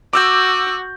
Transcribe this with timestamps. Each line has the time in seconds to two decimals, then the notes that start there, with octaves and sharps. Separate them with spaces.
0.13 F#4 D6 E6 G6